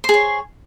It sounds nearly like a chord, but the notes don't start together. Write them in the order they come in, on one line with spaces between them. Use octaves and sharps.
C5 G#4 C#5